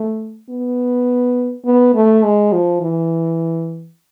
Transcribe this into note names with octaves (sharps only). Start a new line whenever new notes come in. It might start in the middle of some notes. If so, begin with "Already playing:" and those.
Already playing: A3
B3
B3
A3
G#3
F3
E3